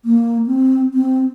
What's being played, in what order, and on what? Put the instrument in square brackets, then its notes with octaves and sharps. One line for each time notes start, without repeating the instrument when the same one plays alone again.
[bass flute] A#3
C4
C4